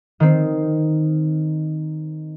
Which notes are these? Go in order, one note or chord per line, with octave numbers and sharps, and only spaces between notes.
D#3 C4